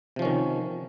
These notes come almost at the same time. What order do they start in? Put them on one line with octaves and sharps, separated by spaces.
C3 F3 C#4 D#3